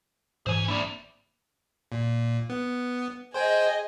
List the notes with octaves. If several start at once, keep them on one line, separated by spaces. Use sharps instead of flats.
G#2 E3 C5 G#5
G#1 A#3 D4 E4 D5
A#2
B3
G#4 C5 D#5 G5 G#5